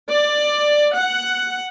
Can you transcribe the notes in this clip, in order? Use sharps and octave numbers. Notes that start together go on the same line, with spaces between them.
D5
F#5